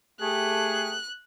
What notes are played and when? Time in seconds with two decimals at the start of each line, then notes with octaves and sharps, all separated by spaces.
0.21 A3 G4 G#4 F#6